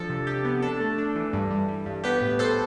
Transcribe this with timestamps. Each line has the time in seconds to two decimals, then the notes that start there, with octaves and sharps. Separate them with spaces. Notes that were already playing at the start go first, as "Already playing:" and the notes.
Already playing: F3 D4 A4
0.10 C3
0.26 C3 G4
0.45 B3
0.62 D4 A4
0.80 A3
0.98 D4
1.16 E3
1.33 G2
1.51 G3
1.68 G3
1.86 G2
2.04 B3 G4 B4
2.22 A2
2.39 A2 A4 C5